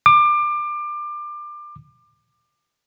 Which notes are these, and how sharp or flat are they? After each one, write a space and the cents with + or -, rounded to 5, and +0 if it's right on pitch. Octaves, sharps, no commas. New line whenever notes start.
D6 +25